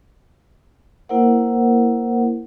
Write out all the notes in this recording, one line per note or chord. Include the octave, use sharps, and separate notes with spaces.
A#3 E4 A#4 C5 F#5